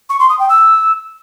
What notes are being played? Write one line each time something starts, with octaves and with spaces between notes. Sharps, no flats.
C#6
C6
D#6
G5
E6